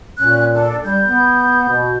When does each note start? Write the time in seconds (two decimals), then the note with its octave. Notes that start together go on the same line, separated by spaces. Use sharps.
0.18 A#2 C#4 F#6
0.54 D4 A4
0.84 G3 G6
1.05 B3
1.69 B2